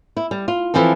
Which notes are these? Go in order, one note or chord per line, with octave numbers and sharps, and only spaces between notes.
E4
G3
F4
E3 F3 C4 A4